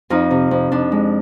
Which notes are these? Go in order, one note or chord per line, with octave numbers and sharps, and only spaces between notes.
F2 D#4 F4
C3
F2
F2 D4
G#3